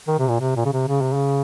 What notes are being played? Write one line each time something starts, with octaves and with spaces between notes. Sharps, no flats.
D#3
C3
A#2
C3
A#2
C#3
C3
C#3
C3
C#3